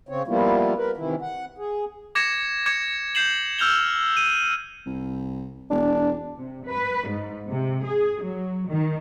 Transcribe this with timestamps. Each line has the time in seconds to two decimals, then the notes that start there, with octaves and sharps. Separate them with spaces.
0.09 C#3 C4 C#5
0.27 F3 G3 A#3 B3 E4 F4
0.77 A#4 B4
0.97 C3 D#3 E3 E4
1.22 F#5
1.58 G#4
2.15 D6 G#6 A#6 C#7 E7
2.66 D6 G#6 C#7 E7
3.15 G6 C7 E7 F#7
3.58 E6 F6 G6 F7 G7
4.17 D#7
4.86 C2
5.71 E1 D4
6.38 C3
6.68 B4
7.09 G#2
7.48 C3
7.84 G#4
8.22 F#3
8.69 D#3